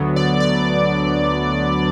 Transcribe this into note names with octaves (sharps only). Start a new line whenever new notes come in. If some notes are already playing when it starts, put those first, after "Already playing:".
Already playing: D2 D3 F#3 B3
D5
D5